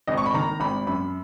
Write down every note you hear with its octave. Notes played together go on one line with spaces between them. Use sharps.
G#1 D#5
C#6
B5
D#3 A#5
G#1 B5
F#2 B5